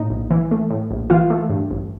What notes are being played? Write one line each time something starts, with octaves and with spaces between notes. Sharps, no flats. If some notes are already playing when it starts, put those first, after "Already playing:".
Already playing: A2 D#4 D#5
A#1
E3
A3
A2
A#1
E3 F4 F5
A3
G2
A1